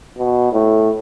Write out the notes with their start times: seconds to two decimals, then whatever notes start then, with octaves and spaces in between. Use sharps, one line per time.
0.18 B2
0.53 A2